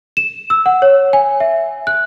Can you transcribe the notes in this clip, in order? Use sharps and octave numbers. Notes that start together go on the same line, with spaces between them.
E7
E6
F#5
C#5
G#5
E5
F#6